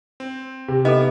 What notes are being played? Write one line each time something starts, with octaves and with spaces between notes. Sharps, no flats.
C4
C3
B3 D#4 A4 D#5 E5